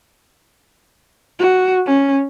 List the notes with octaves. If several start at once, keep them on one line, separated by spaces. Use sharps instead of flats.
F#4
C#4